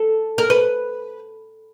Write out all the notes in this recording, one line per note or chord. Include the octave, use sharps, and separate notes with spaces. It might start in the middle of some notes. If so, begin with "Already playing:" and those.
Already playing: A4
A#4
B4